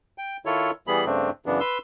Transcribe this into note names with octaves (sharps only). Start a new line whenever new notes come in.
G5
D#3 E4 F4 A4 C#5
E3 G3 B3 G#4 B5
G2 C#3 A3 C4 D4
F#2 C#3 E3 B3 D4
B4 C6 E6